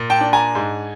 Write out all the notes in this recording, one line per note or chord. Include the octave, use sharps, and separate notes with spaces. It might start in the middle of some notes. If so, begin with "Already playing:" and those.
Already playing: A#2
G5 A5
D4
G#5 A#5
G#2